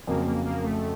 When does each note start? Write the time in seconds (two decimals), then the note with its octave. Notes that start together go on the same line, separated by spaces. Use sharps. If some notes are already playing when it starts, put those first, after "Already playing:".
0.07 F2 C#3 F#3 A#3
0.26 A#3
0.46 A#3
0.64 A3